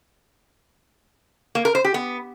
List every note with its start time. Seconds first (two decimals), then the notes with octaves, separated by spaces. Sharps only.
1.55 A#3
1.65 A#4
1.75 C5
1.85 G4
1.94 B3